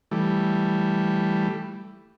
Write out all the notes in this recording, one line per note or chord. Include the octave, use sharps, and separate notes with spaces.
E3 G3 A3